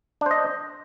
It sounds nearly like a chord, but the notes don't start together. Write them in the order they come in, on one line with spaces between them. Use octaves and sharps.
D4 C5 D#5